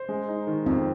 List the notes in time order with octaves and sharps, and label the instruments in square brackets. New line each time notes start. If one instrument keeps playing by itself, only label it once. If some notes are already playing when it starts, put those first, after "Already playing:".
Already playing: [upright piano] C5
G#3
D#4
D#3
[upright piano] F2 [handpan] C4